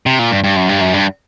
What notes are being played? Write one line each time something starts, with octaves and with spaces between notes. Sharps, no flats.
C3
A#2
G2
G2
F#2
G2
F#2
G2